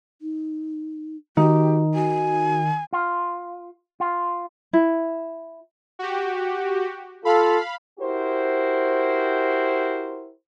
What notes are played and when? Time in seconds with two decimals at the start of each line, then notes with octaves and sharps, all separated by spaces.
0.22 D#4
1.37 D#3 D#4 F#4 G4
1.94 F#4 G#5
2.93 F4
4.00 F4
4.73 E4
5.99 F#4 G4
7.25 F4 A4 F5 B5
7.99 E4 F#4 G4 A#4 C5